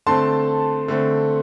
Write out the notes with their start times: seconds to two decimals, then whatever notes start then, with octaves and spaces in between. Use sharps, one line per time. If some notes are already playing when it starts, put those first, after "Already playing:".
0.06 D3 A3 C4 A5 C6
0.88 D3 A3 C4